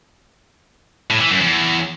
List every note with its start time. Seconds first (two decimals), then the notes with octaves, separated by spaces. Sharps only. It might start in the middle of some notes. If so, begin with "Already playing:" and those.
1.10 A2
1.21 E3
1.31 F#2
1.41 E2